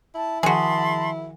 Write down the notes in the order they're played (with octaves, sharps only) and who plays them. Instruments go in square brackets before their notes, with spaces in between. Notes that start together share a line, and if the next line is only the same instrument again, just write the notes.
[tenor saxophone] E4 [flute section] A5
[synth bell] D#3 F3 [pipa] F#4 G#4 [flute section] A5 B5 C6